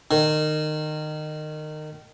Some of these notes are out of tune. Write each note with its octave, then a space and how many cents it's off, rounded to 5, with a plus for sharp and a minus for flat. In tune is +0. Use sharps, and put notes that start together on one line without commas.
D#3 -25